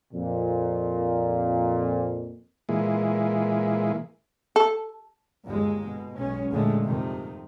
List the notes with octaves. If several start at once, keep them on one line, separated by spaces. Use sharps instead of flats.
F2 A#2
A#2 E3 G#3
A4
G1 D#2 G#3
B2
B1 G#3 C#4
E2 G2 A#2 D3 G#3 A3
F2 C3 D#3